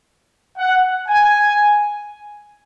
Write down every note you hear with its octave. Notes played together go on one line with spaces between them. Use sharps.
F#5
G#5